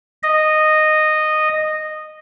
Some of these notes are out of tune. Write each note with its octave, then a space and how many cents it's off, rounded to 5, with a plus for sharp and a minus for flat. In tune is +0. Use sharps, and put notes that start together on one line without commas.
D#5 -10